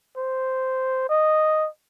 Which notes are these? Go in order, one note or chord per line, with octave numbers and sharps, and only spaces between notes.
C5
D#5